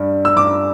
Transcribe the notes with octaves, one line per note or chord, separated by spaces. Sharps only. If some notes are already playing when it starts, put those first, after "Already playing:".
Already playing: G2 G3
E6
G2 D6